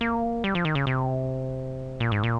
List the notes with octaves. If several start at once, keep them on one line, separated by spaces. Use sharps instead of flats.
A#3
G3
F3
D#3
C#3
C3
A#2
G#2
A#2